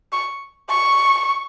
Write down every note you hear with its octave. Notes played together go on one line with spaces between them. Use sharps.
C#6
C#6